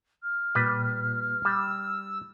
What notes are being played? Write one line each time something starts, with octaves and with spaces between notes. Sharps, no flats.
F6
A#2 G3 B4
G3 E6